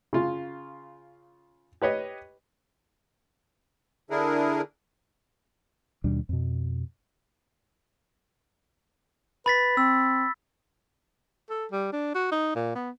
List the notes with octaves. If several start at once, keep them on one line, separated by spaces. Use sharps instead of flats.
C#3 F4
G4 B4 C#5 D#5
D3 D4 E4 G#4 A#4
D#2 B2 G3 D4
F2 B2
B4 B5 A6 B6
C4 E6
A4
G3
D4
F#4
D#4
A#2
B3